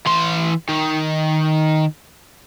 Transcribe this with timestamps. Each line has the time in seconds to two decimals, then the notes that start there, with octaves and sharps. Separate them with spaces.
0.06 E3 C6
0.69 D#3